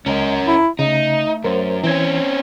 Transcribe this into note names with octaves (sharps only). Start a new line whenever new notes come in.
C#2 G#3 C#4 A#4
E4
C#3 A3 D#4
F#2 A#4 C5
E3 C4 C#4 G#6